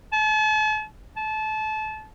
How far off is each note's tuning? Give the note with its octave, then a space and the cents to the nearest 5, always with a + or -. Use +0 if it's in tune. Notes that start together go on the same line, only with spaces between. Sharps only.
A5 -40
A5 -25